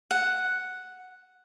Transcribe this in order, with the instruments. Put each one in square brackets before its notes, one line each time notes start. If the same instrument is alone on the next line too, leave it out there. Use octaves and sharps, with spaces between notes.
[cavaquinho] F#5